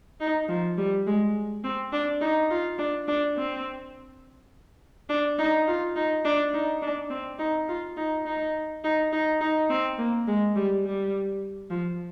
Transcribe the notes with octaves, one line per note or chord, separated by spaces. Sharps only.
D#4
F3
G3
G#3
C4
D4
D#4
F4
D4
D4
C4
D4
D#4
F4
D#4
D4
D#4
D4
C4
D#4
F4
D#4
D#4
D#4
D#4
D#4
C4
A#3
G#3
G3
G3
F3